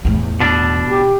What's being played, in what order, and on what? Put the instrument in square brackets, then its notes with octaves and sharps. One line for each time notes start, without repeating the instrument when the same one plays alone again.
[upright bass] E2 A2
[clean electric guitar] B2 D4
[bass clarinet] G4